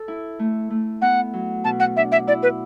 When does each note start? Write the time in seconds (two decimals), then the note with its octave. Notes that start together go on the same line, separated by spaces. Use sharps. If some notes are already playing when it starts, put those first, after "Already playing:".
Already playing: A4
0.08 E4
0.39 A3
0.70 A3
1.02 B3 F#5
1.33 F#3
1.64 B2 A5
1.80 F#5
1.96 D4 E5
2.12 E5
2.27 E4 D5
2.43 B4